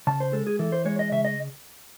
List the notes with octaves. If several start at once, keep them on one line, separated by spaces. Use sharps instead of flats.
C#3 A5
C5
G#3 A4
G#4
E3 A4
C5
G#3 C#5
D#5
C#3 E5
D#5